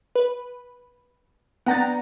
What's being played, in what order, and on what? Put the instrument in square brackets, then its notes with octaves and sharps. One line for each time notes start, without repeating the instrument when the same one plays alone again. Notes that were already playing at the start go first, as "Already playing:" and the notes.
[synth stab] B4
[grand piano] B3 D4 A6 [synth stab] F#5 G5 A#5